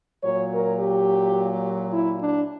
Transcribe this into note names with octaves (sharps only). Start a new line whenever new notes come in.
A#2 F#3 C#5
A#4
G4
E4
D4